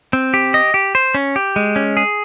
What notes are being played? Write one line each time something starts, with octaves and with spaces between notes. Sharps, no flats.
C4
G4
D#5
G4
C5
C#4
G4
G#3
C#4
G#4